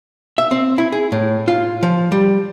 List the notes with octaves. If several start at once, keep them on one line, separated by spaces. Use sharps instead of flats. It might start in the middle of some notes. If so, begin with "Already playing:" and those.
E5
C4
E4
G#4
A2
F4
F3
G3